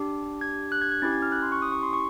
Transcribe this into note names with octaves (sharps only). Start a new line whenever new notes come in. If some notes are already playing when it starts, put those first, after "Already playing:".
Already playing: D4 G4
G#6
F#6
G#6
G#6
C#4 E4 G4 A6
G#6
F6
F#6
C6
C#6
D#6
C#6
C6
C#6